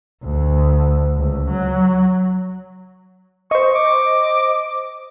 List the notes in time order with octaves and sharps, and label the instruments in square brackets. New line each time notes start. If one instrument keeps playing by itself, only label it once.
[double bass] D2
C#2
F#3
[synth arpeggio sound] C5 D#5 [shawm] C#6
[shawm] D6